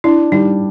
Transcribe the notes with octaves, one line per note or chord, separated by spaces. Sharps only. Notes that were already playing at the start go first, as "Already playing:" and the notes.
D4 E4
G3 D#4